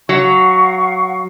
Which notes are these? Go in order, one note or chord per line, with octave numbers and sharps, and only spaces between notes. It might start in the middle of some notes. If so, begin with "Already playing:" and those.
F#3 F5 F#5 C#6